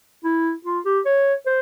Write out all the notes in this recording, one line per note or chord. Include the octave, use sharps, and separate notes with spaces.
E4
F4
G4
C#5
C5